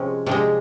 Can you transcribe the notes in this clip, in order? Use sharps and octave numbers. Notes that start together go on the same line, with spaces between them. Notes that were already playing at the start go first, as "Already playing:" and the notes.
Already playing: C3 F3 G#3 C#4
C3 F3 G#3 D4